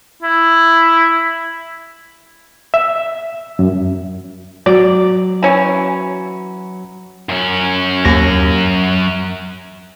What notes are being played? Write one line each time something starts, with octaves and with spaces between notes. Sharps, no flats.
E4
E5
F#2
F#3 D5
E3 C#4
F#2 C#4
D#2 A#6